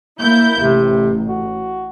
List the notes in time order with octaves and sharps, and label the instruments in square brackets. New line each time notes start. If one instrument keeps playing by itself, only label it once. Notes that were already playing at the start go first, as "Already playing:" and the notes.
[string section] A#3 E4 G6
[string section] A1 [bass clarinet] C3
[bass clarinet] F#4